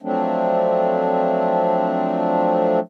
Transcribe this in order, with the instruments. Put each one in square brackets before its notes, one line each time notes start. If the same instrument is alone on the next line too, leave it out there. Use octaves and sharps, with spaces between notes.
[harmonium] F3 F#3 A3 C4 D4